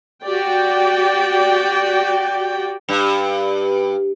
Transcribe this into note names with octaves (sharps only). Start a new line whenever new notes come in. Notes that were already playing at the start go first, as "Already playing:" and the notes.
F#4 G4 D5 G5
G2